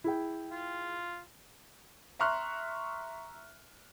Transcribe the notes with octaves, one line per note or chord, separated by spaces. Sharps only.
E4 G#4 G5
F4
E5 A#5 C6 C#6 F6 F#6